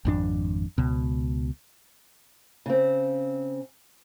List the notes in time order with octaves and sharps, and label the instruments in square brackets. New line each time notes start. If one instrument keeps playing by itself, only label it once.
[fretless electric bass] G#1 F2 D4
C#2 B2
[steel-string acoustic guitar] C#3 C4